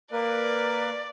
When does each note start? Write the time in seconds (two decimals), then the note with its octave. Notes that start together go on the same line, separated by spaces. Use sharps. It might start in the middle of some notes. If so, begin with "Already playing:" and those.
0.12 A#3 A#4 B4 D5